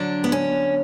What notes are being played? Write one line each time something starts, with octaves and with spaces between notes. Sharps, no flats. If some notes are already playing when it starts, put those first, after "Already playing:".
Already playing: D3 F#3 D4
B3
C#4